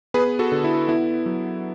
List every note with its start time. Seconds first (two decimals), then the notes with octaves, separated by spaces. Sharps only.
0.14 B3 G#4 B4
0.39 F#4 A4
0.52 D3
0.64 E4
0.88 B3 E4
1.26 F#3